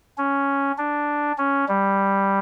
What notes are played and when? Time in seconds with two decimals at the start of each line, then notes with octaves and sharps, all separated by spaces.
0.18 C#4
0.78 D4
1.38 C#4
1.68 G3